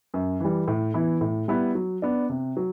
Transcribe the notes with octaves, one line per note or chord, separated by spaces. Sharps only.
F#2
E3 G3
A2
E3 B3 E4
A2
G3 B3 E4 B4
F#3
B3 D4
C3
F#3